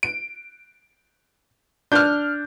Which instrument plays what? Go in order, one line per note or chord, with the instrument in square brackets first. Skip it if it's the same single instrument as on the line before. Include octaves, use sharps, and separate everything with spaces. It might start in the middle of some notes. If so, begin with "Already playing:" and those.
[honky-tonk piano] D7
[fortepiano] D4 [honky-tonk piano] F6 G6